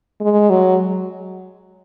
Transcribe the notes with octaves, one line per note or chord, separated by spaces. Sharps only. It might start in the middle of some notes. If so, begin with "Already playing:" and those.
G#3
F#3